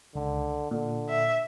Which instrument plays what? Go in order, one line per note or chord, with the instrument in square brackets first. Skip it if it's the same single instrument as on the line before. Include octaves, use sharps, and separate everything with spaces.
[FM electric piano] C#2 [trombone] D3
[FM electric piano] A#2 [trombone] D3
[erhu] E5